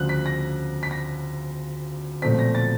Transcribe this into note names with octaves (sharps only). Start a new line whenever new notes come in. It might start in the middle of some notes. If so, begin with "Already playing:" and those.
Already playing: D2 C#3 F3 F#6
B6
A#6
B6
A#6
B1 A#2 F3 A3 C4 B6
A#6
A6